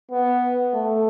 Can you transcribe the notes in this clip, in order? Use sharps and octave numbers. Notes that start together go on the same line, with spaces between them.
B3
A3